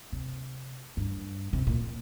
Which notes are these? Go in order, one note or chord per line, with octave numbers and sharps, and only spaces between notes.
C3
G2
C3
A#2